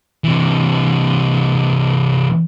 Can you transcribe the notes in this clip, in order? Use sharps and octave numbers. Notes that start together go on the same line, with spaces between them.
C3 E3